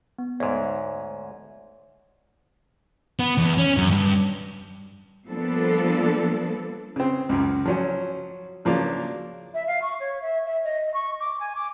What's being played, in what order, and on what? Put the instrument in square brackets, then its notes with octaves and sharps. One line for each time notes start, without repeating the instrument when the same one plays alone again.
[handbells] B3
[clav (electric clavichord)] D2 G#2 [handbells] C#5
[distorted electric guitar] B3
E2
C#4
F#2
G2
[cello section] F3 G3 A#3 B3 D4 A4
[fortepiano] C#3 C4
C#2 F#2
F3 F#3 C#4
C#3 F3 F#3 A#3 D4
[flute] E5
F5
C#6
C#5
E5
E5
D#5
C#6
D6
G#5
D6